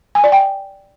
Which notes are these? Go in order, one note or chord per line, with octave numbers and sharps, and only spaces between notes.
G#5
D5
G5